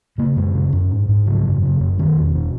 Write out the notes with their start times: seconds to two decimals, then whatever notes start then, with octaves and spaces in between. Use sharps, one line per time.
0.18 C#3 A#3
0.36 F#2 G#3
0.54 C#3
0.73 F#2
0.91 G#2
1.09 G#2
1.26 C#3 F#3
1.45 F#2
1.62 C#3
1.80 F#2
1.98 B2 D#3
2.17 E2
2.35 B2